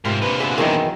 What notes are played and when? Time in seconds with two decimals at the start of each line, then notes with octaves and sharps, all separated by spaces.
0.05 G#2 C3 F4 A#4
0.22 A#2 D3 B4
0.40 B3 F#4 G#4 E5
0.58 E2 D#3 F#3 E4 G#4 A#4